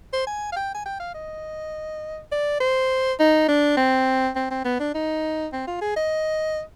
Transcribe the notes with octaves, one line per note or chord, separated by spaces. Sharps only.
C5
G#5
F5
G5
G#5
G5
F5
D#5
D5
C5
D#4
D4
C4
C4
C4
B3
D4
D#4
C4
F4
G#4
D#5